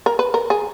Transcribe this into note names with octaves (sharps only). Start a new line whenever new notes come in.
A#4
B4
A#4
G#4